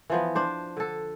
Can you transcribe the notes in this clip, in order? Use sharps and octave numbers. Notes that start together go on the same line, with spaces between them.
E3 F3 B3
D4 C5
D3 A4